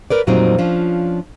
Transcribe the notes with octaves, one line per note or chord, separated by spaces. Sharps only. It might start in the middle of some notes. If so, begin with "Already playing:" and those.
A#4 B4 D5
F2 A#2 F#3 G3 C4 D#4
F3 C#4 D4 F4